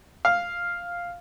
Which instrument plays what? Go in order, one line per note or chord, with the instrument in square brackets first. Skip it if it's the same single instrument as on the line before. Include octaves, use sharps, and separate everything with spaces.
[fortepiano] F5